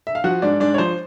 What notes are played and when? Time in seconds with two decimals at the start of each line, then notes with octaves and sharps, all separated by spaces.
0.07 E5
0.15 F5
0.24 F3 F#4 F#5
0.42 G#2 D4 D5
0.60 G#2 D4 D5
0.74 C#5
0.78 F3 C5